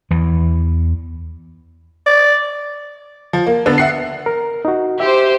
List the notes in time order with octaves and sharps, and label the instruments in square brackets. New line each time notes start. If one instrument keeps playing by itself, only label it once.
[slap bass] E2 E3
[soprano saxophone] D5
[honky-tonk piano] F3
A#3
D3 B3 D4
E5 F#5 C7
[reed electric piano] A#4
D#4 F#4
[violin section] G4 C5 [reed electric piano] E5